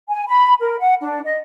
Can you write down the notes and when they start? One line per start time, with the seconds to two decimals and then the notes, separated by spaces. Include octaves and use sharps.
0.09 G#5
0.27 B5
0.60 A#4
0.80 F#5
1.01 D4
1.24 D#5